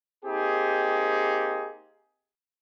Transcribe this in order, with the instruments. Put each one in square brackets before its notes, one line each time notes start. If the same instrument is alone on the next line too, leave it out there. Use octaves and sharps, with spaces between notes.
[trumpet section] A#3 C4 D#4 G4 G#4